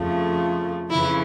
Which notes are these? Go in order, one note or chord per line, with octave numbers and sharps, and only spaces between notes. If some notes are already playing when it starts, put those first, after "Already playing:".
Already playing: F2 C#3 F3 A3
F2 C#3 E3 E4